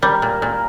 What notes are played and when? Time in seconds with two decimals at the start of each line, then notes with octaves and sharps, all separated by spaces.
0.02 G3 A#4
0.22 A#2
0.42 A#2